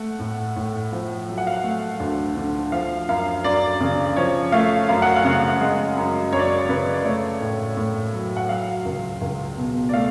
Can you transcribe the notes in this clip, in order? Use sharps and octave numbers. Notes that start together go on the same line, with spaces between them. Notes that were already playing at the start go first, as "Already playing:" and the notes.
Already playing: A3 F#5
A2
A2
F3
F#3
F#5
F5
F#5
A3
D2
D3
F3 F5
F#2 F5
F#2 D5
C#3
F3 C#5
A3 F5
F#2 F5
F#5
F5
C#3
G#3
F#2
F#2 C#5
D5
C#5
C#3 B4
D5
A3 C#5
A2
A2
F#3
F#5
F#3 F5
C#2
C#2
B2
D5
A3 F5